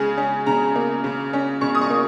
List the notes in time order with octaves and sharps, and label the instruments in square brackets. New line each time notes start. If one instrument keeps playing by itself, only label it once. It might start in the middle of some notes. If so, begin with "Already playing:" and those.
Already playing: [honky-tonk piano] C#3 G#3 G#4
C#4
C#3 A#5
A#3
C#3
C#4
C#3 C#6
D#6
C#6
A#3